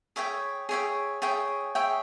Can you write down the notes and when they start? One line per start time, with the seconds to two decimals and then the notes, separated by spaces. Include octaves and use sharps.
0.16 G#4 C#5 E5 G5
0.69 G#4 C#5 E5 G5
1.22 G#4 C#5 E5 G5
1.75 G#4 C#5 E5 G5